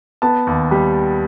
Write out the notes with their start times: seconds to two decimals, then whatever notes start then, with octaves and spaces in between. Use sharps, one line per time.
0.22 B3 A5
0.47 D#2
0.71 G3